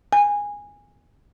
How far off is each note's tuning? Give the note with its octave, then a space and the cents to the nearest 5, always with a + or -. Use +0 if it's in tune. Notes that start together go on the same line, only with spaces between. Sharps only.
G#5 -15